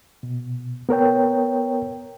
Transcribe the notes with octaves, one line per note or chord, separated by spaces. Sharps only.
B2
B3 A#4 C#5 G5